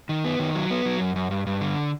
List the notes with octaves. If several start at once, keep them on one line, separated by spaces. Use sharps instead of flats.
D#3
B3
D#3
F#3
B3
F#3
F#2
F#2
G2
G2
D3